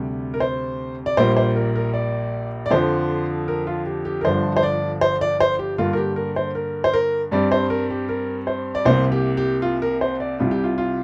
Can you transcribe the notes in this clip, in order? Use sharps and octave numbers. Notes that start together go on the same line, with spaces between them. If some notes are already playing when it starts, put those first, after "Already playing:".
Already playing: D2 C3 G3
A#4
C5
D5
A#1 A#2 G3 A#3 C5
C5
A#4
A#4
D5
D5
F2 D3 F3 C5
A#4
F4
G4
G4
A#4
G1 G2 D3 F3 D4 C5
C5
D5
C5
D5
C5
G4
G2 D3 A#3 F4
A#4
G4
A#4
C5
A#4
C5
A#4
G2 G3 C4 D5
C5
A#4
G4
A#4
C5
D5
C2 C3 A#3 C5
G4
G4
F4
A#4
C5
D5
C2 C3 G3 F4
G4
F4
F4